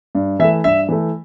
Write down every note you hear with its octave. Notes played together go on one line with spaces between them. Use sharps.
G2
E3 A3 E5
G2 E5
E3 A3